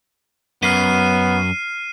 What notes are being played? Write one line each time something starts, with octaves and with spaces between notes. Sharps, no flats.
F#2 B3 F6 C7 D#7